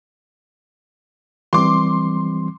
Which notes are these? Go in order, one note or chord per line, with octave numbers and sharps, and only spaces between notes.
E3 G3 C4 C6 D6